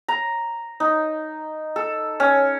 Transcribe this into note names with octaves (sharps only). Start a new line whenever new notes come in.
A#5
D#4
A4
C#4